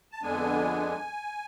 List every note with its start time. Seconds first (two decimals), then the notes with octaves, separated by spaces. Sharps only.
0.12 A5
0.22 F2 D3 G#3 B3 D4 G#5